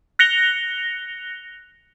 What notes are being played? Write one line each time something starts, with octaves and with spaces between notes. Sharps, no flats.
F#6 A#6 C#7 F7 G7